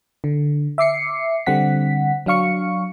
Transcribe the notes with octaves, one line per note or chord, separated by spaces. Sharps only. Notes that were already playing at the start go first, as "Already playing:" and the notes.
D3
E5 D6 C7 C#7
D3 G3 C4 F#5 B6
F#3 D4 F5 C#6 C#7